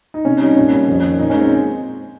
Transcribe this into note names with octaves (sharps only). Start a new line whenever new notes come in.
D#4
C3 C#4
G3 D#4
A#2 C#4
G3
F2
D#3
A#2 D#4
G#3 C#4
C4